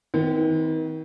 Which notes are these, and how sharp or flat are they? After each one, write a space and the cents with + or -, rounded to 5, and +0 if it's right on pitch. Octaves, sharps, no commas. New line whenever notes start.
D#3 +40 C4 -35